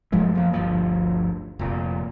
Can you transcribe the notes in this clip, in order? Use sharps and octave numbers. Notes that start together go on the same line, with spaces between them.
F#2 F3 G#3 A3
F3 A#3
G1 D2 G2 F3
F1 A#2